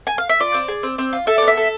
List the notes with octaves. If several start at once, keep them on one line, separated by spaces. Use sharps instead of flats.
G#5
F5
E5
F4 D5
C4
G#4
C4
C4
F4
A4 E5
B3 D5
E5
A4